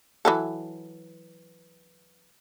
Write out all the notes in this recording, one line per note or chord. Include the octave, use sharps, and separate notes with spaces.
E3 F#3 A4